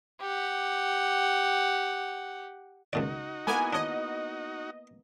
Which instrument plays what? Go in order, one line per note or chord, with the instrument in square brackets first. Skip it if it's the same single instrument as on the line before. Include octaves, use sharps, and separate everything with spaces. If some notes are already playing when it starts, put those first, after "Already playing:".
[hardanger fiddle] G4 F#5
[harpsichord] C#2 A#2 D5 [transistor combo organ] D#4 F#4
[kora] A#3 B3 E4 [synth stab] G#5
[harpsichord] D4 C#5 [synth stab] D#5